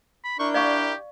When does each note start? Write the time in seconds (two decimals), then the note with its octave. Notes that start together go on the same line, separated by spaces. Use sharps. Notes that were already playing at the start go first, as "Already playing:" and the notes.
0.24 B5
0.39 D4 E4 A#4 C#6 G6
0.54 G4 D5 F5 C#6